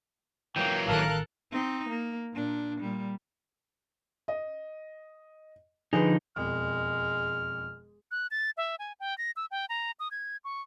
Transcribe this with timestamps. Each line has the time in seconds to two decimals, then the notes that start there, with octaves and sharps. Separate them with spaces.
0.56 E3 F#3 A#3 G5
0.88 A1 D#3 A4 A#4 F5 F#6
1.52 C4 D#4
1.89 A#3
2.34 A#2 D4
2.80 A#2 G3
4.28 D#5
5.93 D3 F3 D#4 G#4 B4
6.36 E1 F2 G#3 F6
8.11 F#6
8.31 A6
8.57 E5
8.79 G#5
9.00 G5
9.18 A#6
9.36 E6
9.51 G5
9.69 A#5
10.00 D#6
10.11 G#6
10.44 C#6